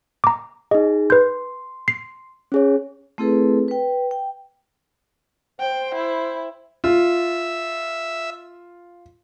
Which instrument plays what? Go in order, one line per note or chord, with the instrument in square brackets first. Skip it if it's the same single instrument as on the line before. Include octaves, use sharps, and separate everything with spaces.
[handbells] A#5 D6
[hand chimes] D#4 G#4 [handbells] D#5
[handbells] B4 G6 [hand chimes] C6
[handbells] C7
[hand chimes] C#4 G#4 C#5
[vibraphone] A3 C4 E4 G#4 A4 B4
B4 G5
G5
[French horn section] C5 [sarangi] G5
[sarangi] E4
[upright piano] F4 [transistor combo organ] E5